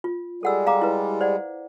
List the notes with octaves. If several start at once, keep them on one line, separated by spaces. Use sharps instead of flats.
F4
G3 G#3 A4 F#5 E6
F5 A#5 D6
E4 B4
C5 D5 F#5